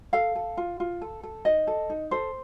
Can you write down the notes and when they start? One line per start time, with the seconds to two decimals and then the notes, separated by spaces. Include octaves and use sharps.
0.13 A4 F5
0.35 A4
0.57 F4
0.80 F4
1.02 A4
1.23 A4
1.45 D#4 D#5
1.67 A4
1.90 D#4
2.11 A4 C5